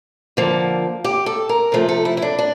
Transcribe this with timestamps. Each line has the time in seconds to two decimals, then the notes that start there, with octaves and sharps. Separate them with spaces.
0.37 D3 F3 A#3
1.04 G4
1.26 A4
1.49 A#4
1.72 C3 F3 A3
1.89 A4
2.05 E4
2.17 E4
2.22 D4
2.39 D4